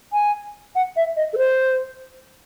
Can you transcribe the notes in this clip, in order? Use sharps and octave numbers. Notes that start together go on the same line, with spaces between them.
G#5
F#5
E5
D#5
A4
C5